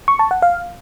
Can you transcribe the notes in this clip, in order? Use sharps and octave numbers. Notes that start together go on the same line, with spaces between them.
C#6
A5
F#5
F5